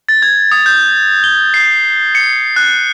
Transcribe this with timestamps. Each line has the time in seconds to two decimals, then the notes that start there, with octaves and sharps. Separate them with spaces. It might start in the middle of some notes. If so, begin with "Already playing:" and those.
0.09 A6
0.22 G#6
0.51 D#6
0.66 G6
1.24 G7
1.54 C7
2.15 C#7
2.56 F#6